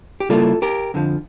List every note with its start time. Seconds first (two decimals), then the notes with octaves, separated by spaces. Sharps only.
0.20 G4
0.29 C#3 G3 A#3 E4 F4 A4
0.62 G4 A#4
0.94 F2 D3 F3